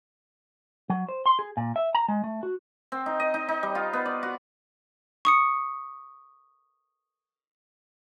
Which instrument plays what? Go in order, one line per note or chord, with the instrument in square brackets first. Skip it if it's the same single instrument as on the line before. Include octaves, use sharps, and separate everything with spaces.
[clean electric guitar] F#3
C5
C6
G#4
A#2
E5
A#5
G#3
A3
F#4
[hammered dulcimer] C4
D#4
D#5
D#4
D#4
G3
F4
B3
D5
F#4
[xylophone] C#6 D#6 C#7